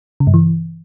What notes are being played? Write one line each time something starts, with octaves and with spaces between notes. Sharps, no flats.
C#3
G2
E3